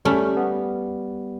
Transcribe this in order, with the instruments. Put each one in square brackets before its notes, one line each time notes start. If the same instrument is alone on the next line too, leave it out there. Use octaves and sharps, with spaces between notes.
[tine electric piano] G3 [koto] A3 C#4
[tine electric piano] B3